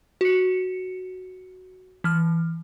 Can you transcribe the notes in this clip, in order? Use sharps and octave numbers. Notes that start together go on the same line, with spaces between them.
F#4 C#7
E3 F6